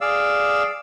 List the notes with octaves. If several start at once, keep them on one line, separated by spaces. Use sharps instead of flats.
G#4 D5 F5 E6